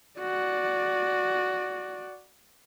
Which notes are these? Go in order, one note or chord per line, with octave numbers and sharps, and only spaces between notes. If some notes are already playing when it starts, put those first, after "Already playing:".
F#4 D5